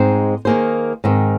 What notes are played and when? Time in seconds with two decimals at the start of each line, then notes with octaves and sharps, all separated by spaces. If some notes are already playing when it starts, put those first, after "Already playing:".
Already playing: G#2 G#3 C4 D#4 C5
0.45 D#3 A#3 G#4 C5
1.04 G#2 D#3 C4